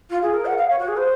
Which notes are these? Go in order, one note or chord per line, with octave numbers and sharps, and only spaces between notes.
F4
G#4
A#4
F#5
F5
C#5
F#4
G#4
C5